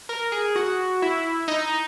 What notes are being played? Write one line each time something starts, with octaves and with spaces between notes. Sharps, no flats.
A#4
G#4
F#4
E4
D#4